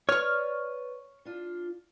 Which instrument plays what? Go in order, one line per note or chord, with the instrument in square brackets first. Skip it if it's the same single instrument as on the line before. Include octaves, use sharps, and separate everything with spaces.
[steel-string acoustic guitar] B4 D5 [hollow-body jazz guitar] C#5 [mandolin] C#6 F6
[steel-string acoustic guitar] D4 F4